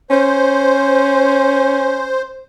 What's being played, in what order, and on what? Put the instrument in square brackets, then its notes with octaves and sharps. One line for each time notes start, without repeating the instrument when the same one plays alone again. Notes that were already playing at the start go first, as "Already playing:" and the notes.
[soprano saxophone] C#4 [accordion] C5